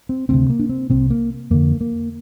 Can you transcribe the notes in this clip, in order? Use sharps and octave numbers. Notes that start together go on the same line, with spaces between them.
C4
D2 C3 C4
A#3
D4
C4
C2 C3 C4
A#3
F2 D3 A#3
A#3